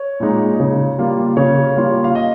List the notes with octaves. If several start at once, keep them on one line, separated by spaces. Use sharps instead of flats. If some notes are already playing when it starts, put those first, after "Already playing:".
Already playing: C#5
A#2 G#3 D#4
C#3
G3 A#3 F4
C#3 C#5
G3 A#3 F4
F5
D#5